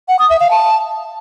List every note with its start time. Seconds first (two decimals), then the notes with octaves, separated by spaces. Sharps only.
0.08 F#5
0.19 D#6
0.30 E5
0.40 F5
0.51 A5